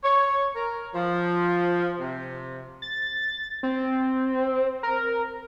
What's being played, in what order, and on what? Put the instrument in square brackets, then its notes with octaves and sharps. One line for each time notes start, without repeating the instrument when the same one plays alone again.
[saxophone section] C#5
A#4
F3
C3
[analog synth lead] A6
C4
A#4